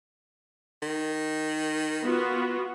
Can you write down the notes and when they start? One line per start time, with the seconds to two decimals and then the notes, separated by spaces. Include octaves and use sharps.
0.83 D#3
2.02 B3 F4 F#4